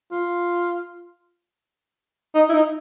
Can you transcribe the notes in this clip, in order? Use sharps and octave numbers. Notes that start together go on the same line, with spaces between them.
F4
D#4
E4
D#4